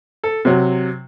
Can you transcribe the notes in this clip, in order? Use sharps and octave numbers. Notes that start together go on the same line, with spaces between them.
A4
C3 F#3